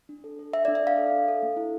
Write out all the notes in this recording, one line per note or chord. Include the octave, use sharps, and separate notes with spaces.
D4
A4
A4
A4 E5
D5
D4
E5
A4 F5
A4
D4
A4
A#3
E4